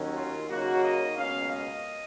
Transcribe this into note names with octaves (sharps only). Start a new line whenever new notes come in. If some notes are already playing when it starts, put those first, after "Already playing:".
Already playing: D#2 D#3 F#3 C#4
F4
C#3 F#3 A#3 D#4 F#4
D#5
C#2 B2 A#3 C#4 F5
D#5